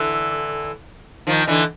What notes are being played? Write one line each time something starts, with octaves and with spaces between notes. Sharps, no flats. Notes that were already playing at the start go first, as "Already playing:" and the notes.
Already playing: D3 E3
D#3 F3
D3 E3